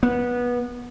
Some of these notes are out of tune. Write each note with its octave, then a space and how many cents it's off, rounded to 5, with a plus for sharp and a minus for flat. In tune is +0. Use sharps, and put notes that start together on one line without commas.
B3 -20